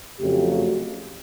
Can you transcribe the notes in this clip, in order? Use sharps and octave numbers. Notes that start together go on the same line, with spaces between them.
F2 C#3 F#3 A3 G4
F#4